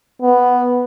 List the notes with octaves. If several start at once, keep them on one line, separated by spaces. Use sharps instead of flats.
B3